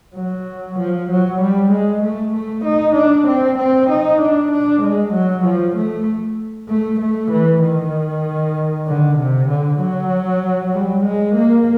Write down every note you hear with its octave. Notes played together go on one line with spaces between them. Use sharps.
F#3
F3
F#3
G3
G#3
A3
A3
D#4
D4
C4
C4
D#4
D4
D4
G#3
F#3
F3
A3
A3
A3
E3
D#3
D3
C3
D3
F#3
G3
G#3
A#3